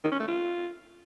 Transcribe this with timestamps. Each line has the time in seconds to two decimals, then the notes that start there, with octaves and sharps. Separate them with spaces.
0.04 D#3
0.12 C#4
0.20 A3
0.27 F4